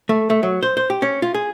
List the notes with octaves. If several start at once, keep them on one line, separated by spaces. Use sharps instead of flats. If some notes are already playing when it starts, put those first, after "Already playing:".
A3
A3
F#3
C5
C5
G4
C#4
F4
G#4